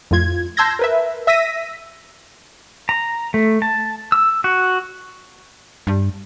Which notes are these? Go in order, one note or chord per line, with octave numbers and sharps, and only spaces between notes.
F2 A2 F4 G#6
A5 C6 E6 G6 G#6 A#6
A#4 B4 E5
E5 E6 A#6 B6 D#7
A#5
A3
A5
E6
F#4
G2